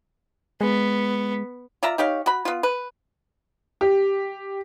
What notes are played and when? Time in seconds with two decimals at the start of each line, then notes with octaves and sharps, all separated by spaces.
0.61 G#3 B3
1.83 F4 D5 E5 A#5
1.98 D#4 G4 C#5 F5
2.26 F#4 B5
2.45 B3 F4
2.63 B4
3.81 G4